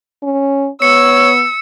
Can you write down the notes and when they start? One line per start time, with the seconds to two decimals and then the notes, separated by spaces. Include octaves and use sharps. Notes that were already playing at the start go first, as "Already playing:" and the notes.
0.23 C#4
0.82 B3 C#5 E6 C#7